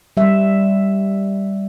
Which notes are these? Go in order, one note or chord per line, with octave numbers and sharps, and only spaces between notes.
G3 E5